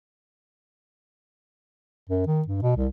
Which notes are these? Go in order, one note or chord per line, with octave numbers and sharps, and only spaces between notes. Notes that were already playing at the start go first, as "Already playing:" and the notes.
F#2
D#3
G2
B2
C2